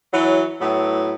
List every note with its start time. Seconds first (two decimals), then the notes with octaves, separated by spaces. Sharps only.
0.13 E3 F#3
0.61 A2 F#3 B3